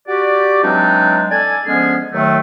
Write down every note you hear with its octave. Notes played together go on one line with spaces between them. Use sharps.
F#4 G4 D5
E3 F#3 G#3 C4 D4 D#4
A4 D5 G#5
D3 F3 G#3 B3 C#4 G#4
D#2 D#3 F#3 A3